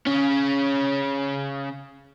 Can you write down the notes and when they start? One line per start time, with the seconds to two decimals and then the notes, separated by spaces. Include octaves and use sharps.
0.07 C#3 C#4